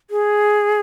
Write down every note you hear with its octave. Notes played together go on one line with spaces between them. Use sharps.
G#4